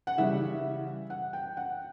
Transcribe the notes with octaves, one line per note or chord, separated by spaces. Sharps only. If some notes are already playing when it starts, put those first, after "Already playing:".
F#5
C#3 E3 G3 E5
F#5
G5
F#5